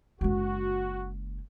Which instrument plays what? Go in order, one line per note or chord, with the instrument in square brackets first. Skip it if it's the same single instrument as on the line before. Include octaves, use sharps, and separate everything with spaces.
[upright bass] F#1 G#3 [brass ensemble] F#4